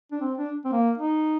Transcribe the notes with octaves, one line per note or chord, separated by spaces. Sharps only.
D4
C4
D4
C4
A#3
D#4